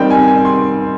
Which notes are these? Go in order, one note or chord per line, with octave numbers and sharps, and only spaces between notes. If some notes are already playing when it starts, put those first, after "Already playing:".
Already playing: D#3 G3 C4 D#5 G5
G#5
G#5
C6